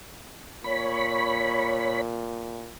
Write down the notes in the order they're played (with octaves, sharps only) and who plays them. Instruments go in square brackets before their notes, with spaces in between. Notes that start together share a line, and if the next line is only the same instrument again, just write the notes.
[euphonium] A#2 [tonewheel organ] C#5 B5